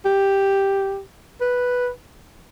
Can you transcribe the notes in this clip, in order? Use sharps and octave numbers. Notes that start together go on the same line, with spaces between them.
G4
B4